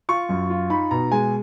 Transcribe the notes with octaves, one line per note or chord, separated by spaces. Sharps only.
F4 C#6
F#2
F4
D#4 B5
B2 A#5
G#3 G#5